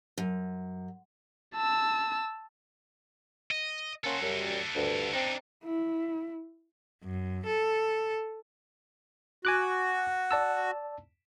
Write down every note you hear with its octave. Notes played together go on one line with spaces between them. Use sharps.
F#2
A5 E6
D#5
A#3 C#4 F#4 A4 C6
F#2 G3
D2 G2
C4 D4 D#4
E4
F#2
A4
F#4 G#5 D6 F#6
D5 A5 E6